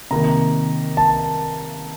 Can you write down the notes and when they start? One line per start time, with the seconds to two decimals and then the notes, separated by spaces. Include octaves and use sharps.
0.11 C3 D#3 A#3 A#5
0.97 A5